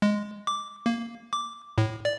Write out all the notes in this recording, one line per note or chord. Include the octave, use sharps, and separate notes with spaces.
G#3
D6
A#3
D6
A2
D5